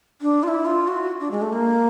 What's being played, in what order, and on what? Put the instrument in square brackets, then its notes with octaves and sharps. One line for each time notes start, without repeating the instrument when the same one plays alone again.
[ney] D4
F4
E4
F4
F#4
D4
G#3
A3
A#3